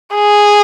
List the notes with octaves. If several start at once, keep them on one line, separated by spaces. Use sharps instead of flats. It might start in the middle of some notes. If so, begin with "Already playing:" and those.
G#4